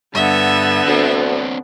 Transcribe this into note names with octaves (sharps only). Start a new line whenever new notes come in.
G2 D3 B3 E5
D2 C4 D4